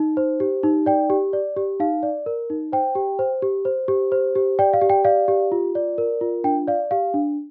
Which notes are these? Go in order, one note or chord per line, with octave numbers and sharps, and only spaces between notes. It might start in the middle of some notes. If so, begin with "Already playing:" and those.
Already playing: D#4
C5
G4
D#4
D5 G5
G4
D5
G4
D#4 F5
D5
A#4
D#4
C5 G5
G4
C5
G4
C5
G4
C5
G4
D5 G5
F5
G4
G5
D5 F5
G4
F4
D5
A#4
F4
D4 G5
D5 F5
G4 F5
D4